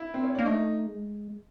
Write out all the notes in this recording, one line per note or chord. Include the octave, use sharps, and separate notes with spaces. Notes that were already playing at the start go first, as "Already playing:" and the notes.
Already playing: E4
C4
C#4
A#3 D4
A3 D#4
G#3